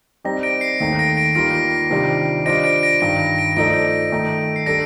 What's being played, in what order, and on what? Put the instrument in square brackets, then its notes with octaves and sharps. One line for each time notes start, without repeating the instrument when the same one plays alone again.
[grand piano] G3 C4 D#4 G4 D5 [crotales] A#6
[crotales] A#6 D7
C7
[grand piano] D#2 D#3 A3 [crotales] A#6
[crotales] A#6 D7
A#6 D7
[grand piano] D#3 G3 A#3 F4 [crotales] A#6 D7
[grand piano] C3 D#3 G3 D4 F4
[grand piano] G3 D4 F4 C5 D#5 [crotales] A#6 D7
[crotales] A#6 D7
A#6 D7
[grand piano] G2 D#3 G3 [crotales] A#6 D7
[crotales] A#6 D7
[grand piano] F3 A3 D#4 A4 D5 [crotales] A#6 D7
[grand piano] D#3 A3 D#4
[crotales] C7
[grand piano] G3 D4 A4 [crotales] A#6 D7